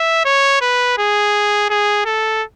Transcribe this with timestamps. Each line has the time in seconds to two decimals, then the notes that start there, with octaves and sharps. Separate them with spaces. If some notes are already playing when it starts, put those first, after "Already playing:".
Already playing: E5
0.25 C#5
0.61 B4
0.98 G#4
1.70 G#4
2.05 A4